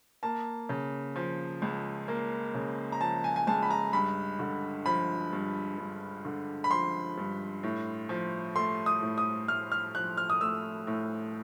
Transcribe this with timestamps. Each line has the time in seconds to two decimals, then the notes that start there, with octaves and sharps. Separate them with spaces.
0.23 A#3 A5
0.69 C#3
1.16 F3
1.62 C#2
2.08 A#3
2.55 C#3
2.92 A#5
3.00 F3 A5
3.24 G#5
3.36 G#5
3.47 C#2 A5
3.63 B5
3.71 A#5
3.93 G2 B5
4.39 D3
4.86 F3 B5
5.32 G2
5.78 G2
6.25 D3
6.64 B5
6.71 F3 C6
7.17 G2
7.63 A2
8.09 F3
8.56 A3 C6
8.86 D#6
9.02 A2
9.18 D#6
9.48 A2 F6
9.72 F6
9.95 F3 F#6
10.17 F6
10.30 D#6
10.41 A3 E6
10.87 A2